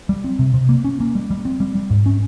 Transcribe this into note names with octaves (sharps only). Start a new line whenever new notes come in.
G3
C4
C3
C3
A#3
C#4
A#3
G3
G3
C4
G3
G3
G#2
C#4